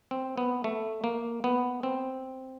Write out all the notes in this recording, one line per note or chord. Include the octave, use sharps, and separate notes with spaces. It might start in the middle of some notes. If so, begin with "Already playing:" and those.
C4
B3
A3
A#3
B3
C4